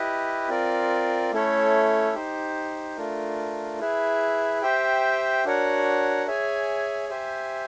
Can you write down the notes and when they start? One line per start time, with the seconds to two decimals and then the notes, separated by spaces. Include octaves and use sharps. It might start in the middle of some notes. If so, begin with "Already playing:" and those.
Already playing: E4 G4 B4 D#5
0.49 C4 F4 A#4 D5
1.32 A3 C#4 E4 A4 C#5
2.14 D#4 G4 C5
2.97 A3 D4 F4 A#4
3.80 E4 G#4 B4 E5
4.62 G4 C5 E5 G5
5.45 D4 F#4 A#4 C#5 F#5
6.27 G#4 C#5 E5 G#5
7.09 G4 C5 E5 G#5